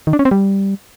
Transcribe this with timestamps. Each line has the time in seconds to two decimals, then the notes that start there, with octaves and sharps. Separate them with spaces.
0.07 D#3
0.13 D4
0.19 C#4
0.25 C4
0.31 G3